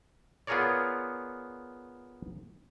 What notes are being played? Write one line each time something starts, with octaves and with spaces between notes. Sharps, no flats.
B3 F4 G#4 A#4 C#5 D5